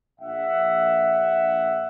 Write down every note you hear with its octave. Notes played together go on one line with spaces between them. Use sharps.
A#1 E5 F#5